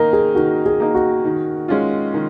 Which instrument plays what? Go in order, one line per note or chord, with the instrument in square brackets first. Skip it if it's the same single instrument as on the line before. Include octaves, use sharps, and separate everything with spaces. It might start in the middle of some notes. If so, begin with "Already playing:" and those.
Already playing: [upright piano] D#3 A#3 D#4 [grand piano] A#4
[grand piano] G#4
[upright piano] D#3 [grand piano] F#4
[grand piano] G#4
[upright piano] A#3 D#4
[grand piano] F#4
[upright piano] D#3
G#3 C#4 F4
D#3